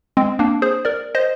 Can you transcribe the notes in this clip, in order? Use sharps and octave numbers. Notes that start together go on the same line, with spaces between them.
G#3 C4
A#3 D4
G#4 C5
A#4 D5
C5 D#5